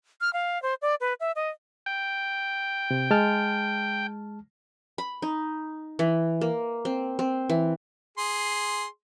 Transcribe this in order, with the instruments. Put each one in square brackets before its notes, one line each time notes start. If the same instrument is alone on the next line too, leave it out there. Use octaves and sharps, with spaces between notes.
[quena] F6
F5
C5
D5
B4
E5
D#5
[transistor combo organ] G5
[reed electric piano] C3
G#3 A5 F6
[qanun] B5
D#4
E3
A#3
C4
C4
E3
[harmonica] G#4 C6